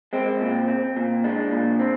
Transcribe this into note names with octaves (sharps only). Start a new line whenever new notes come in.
G#3 C4
A#2
C4
A#2
G#3 D4
A#2
C4